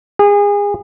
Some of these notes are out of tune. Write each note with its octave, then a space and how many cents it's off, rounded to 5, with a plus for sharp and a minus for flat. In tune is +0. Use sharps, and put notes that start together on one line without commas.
G#4 -30